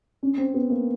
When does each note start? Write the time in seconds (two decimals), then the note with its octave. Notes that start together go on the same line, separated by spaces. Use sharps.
0.23 C#4
0.38 C4
0.54 B3
0.70 A#3